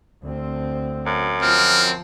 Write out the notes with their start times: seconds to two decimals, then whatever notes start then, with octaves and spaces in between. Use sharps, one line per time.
0.23 D2 C4
1.06 F#2
1.42 F3 C4 F6